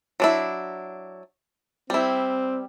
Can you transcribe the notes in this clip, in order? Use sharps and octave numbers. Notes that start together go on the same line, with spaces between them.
F#3 D4 E4
G3 C4 E4